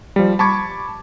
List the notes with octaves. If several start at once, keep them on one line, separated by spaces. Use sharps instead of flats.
F3 G3
A5 B5 C#6 D6 G#6